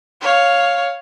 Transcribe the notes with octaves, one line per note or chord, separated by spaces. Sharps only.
C#5 F5